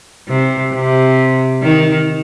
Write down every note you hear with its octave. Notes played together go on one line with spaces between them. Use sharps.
C3
C3
D#3